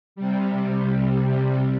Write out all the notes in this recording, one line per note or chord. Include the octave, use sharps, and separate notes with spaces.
C3 G3